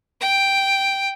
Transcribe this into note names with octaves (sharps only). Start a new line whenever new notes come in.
G5